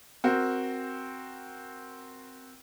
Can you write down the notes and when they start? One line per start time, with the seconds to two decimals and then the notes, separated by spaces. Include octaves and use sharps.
0.24 C4 F#4 A#4